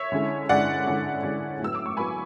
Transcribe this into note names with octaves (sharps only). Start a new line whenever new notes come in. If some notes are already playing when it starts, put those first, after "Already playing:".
Already playing: C#5 E5
D3 G#3 C#4 E4
D3 G#3 C#4 E4 D5 F#5
D3 G#3 C#4 E4
D3 G#3 C#4 E4
A2 F#3 B3 E6
D6
C#6
A2 F#3 B3 G#5 B5